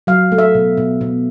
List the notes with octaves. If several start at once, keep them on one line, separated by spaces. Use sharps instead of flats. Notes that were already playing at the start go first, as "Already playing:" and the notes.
F#3 F5
A3
E5
B2
B2
B2